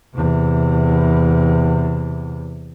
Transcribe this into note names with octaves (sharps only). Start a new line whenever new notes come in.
E2 C3